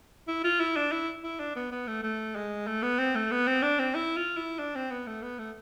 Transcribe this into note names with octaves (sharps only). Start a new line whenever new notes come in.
E4
F4
E4
D4
E4
E4
D4
B3
B3
A3
A3
G#3
A3
B3
C4
A3
B3
C4
D4
C4
E4
F4
E4
D4
C4
B3
A3
B3
A3